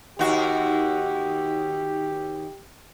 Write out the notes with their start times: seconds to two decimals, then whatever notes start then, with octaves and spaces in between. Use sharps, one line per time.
0.19 D#2 F#4 G4